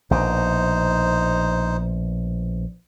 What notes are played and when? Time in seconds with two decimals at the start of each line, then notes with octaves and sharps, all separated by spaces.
0.11 A#1 B2 D#4 C5